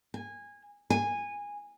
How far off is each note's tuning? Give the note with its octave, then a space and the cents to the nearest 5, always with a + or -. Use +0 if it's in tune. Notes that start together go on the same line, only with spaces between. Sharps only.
G#5 -20
G#5 -15